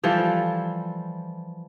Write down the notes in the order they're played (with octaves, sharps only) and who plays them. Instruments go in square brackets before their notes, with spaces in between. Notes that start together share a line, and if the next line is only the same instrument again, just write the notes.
[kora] E3 F3 G3 A4